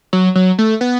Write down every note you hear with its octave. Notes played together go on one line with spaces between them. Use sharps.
F#3
F#3
A3
B3